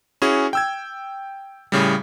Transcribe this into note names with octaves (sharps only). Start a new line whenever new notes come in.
C#4 E4 F#4 G#4
G5 E6 G#6
A2 C#3 G3